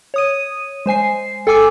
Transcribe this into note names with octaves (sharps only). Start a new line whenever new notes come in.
C#5 D#6 D#7
G#3 C5 G#5 C7
A4 G5 G#5 D6 E6